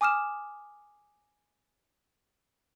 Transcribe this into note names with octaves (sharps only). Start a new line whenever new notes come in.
G#5 D6 D#6 F6 E7